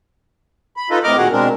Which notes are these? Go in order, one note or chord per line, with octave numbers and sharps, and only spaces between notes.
B5
D#4 F4 A4 B4 D#5
A2 C3 A#4 D#5 D6 F6
A#2 D#3 F#4 G#4 F#5
B2 G#3 C4 D4 A#4